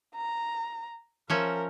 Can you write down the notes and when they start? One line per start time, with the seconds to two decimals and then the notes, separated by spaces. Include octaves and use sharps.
0.16 A#5
1.30 F3 C#4 A#4 E5